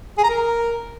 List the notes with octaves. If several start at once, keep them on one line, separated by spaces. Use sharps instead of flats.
G#4
A#5
A#4